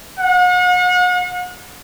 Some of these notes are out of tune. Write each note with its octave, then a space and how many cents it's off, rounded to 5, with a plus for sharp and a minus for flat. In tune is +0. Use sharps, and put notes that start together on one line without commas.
F#5 -40